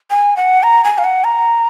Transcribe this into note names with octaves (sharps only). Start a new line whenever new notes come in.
G#5
F#5
A#5
G#5
F5
F#5
A#5